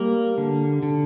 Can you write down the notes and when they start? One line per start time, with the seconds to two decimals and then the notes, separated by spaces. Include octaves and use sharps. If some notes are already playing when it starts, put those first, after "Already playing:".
Already playing: G3 A#3
0.38 D3
0.83 D3